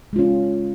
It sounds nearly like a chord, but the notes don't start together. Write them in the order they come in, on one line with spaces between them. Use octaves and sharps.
G#3 F4 C#4